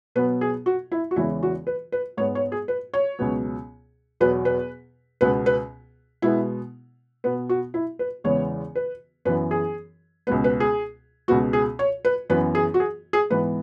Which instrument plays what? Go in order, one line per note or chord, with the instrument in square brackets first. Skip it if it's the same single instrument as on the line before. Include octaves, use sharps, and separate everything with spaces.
[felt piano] B2 F#3 B3 B4
G#4
F#4
E4
F#4
E2 C#3 E3 G#3 E4
F#4
B4
B4
G#2 G#3 B3 C#5
C#5
G#4
B4
C#5
C#2 B2 F#3 B3
E2 B2 F#3 B3 B4
B4
C#2 B2 B3 B4
B4
B2 G#3 B3 E4
B2 B3 B4
F#4
E4
B4
E2 C#3 E3 G#3 B3 C#5
B4
F#2 B4
E3 B3
G#4
C#2 B2 G#3 B3 B4
B4
G#4
C#2 B2 B3 F#4
G#4
C#5
B4
F#2 E3 B3 B4
G#4
F#4
G#4
G#4
G#2 E3 B3 B4